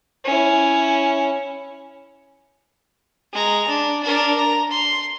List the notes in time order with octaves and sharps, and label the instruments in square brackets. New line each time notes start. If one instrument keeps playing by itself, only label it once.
[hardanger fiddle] C#4 E4
[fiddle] G#3 A#5
D4
D4 A#4
A#5
C6